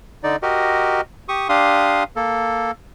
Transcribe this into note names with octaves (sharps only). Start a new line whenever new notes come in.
D3 D#4 D5
F#4 G4 A#4 D#5
G4 C#6 D#6
D4 G4 F5 C6 D#6
A#3 A4